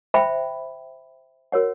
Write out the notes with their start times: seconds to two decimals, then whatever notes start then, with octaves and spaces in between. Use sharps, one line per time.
0.14 C5 E5 G5 B5
1.52 F#4 A#4 C#5 F#5